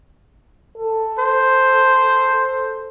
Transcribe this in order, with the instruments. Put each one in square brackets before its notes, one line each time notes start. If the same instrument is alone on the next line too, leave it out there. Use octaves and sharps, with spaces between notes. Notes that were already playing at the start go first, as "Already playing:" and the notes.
[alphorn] A4
[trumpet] C5